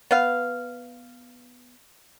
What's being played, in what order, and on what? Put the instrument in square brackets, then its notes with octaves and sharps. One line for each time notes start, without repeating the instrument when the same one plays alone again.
[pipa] B3 F5